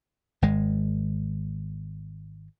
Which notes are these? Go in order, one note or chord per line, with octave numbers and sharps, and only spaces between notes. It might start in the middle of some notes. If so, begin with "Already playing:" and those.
G#1 G#3